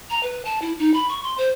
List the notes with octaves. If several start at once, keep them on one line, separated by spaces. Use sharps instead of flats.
A#5
B4
A5
E4
D#4
B5
C#6
C6
C5